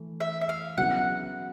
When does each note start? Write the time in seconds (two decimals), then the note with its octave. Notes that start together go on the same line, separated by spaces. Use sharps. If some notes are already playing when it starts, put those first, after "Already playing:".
Already playing: E3 A3
0.20 E5
0.41 E5
0.49 F5
0.77 C#3 F#3 B3 E4 F#5